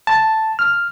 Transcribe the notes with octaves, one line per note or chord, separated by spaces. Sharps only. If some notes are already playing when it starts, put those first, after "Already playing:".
A5
F6